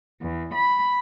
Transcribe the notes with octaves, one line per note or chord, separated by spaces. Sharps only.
E2
B5